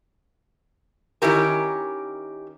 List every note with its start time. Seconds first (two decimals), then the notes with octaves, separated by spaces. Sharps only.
1.22 D#3 C#4 E4 G4 A#4